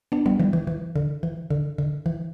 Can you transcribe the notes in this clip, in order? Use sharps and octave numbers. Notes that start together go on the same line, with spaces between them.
B3 D4
G3 B3
E3 G3
E3
E3
D3
E3
D3
D3
E3